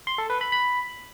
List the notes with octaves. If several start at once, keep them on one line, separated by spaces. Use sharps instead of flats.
C6
A4
B4
B5
B5